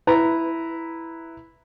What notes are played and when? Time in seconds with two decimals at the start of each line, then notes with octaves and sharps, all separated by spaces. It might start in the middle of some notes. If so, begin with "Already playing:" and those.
0.07 E4 B4 A#5